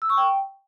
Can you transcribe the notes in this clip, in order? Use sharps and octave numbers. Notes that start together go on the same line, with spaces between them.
E6
C#6
G5